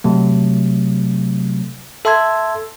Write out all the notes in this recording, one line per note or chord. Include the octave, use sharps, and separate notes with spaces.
C3 F#3 A3
A4 E5 A5 C6 E6 G#6